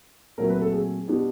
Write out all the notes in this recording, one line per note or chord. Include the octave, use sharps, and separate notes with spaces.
A#2 F#3 A3 C4 A#4
B4
A4
G#4
B2 G3 B3 D4